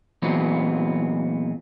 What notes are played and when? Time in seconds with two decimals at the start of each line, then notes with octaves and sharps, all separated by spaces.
0.22 A#2 E3 F#3 G#3 B3 C4